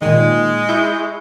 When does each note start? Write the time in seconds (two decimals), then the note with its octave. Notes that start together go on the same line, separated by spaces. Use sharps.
0.02 A#2 D#3 G#3
0.69 E4 C#6 G6